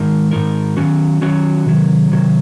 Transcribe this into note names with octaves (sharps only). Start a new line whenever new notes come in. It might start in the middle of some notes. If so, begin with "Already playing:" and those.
Already playing: G#2 D#3 G#3 D#4 A#4
G#2 D#3 G#3 D#4 A#4
D#3 F#3 C#4 F#4
D#3 F#3 C#4 F#4
C3 D#3 F#3
C3 D#3 F#3